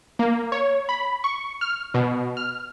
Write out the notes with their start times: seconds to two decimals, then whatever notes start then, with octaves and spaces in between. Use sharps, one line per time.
0.19 A#3
0.52 C#5
0.89 B5
1.24 C#6
1.61 F6
1.94 B2
2.37 F6